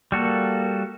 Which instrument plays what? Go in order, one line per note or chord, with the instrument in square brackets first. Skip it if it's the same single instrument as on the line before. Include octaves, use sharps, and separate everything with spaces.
[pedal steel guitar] G3 F#4 A4 [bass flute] A#3